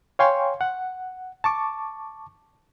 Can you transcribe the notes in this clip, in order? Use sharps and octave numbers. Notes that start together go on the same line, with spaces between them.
C#5 F5 G5 G#5 C6 C#6
F#5
A5 C#6 D6